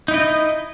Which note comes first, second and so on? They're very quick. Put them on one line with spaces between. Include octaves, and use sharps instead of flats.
D#4 E4 D#5